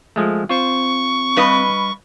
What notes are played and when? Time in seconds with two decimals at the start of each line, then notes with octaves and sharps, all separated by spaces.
0.16 F3 G#3 A3
0.49 C4 F4 C5 C#6
1.36 G2 B4 D#5